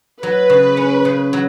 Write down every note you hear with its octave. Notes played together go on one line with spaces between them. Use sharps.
F#3 B4
C#3
C#4
C#3
F#3